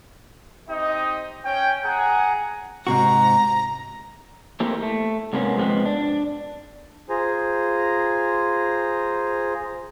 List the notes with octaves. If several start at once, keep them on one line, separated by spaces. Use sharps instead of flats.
C4 D#4 G4 D#5
C#4 C#5 G5
G#4 F#5 G#5 A#5
G#2 C3 F#4 A#5
A3 A#3 C4 E4 G4
A3
G#2 C3 A#3 B3 C#4
G#2 C3 F3 G#3 B3 C4
D4
F4 G#4 C5 G#5 A#5